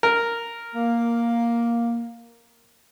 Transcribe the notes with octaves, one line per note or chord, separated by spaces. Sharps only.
A#4
A#3